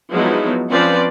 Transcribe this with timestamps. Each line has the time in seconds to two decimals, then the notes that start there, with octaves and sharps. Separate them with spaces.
0.12 F3 F#3 G#3 B3 D#4 E4
0.70 F3 C4 C#4 B4 C5 D5